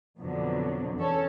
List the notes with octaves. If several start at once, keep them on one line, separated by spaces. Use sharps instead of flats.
F2 B2 D3 F#3
E2 C#4 A4 C#5